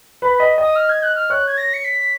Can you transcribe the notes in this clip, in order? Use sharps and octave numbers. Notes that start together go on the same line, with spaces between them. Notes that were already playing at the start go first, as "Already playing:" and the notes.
B4 B5
D#5 B5
D#5 D#6
F6
G#6
F#6
F6
C#5 F#6
G#6
A#6
C#7
B6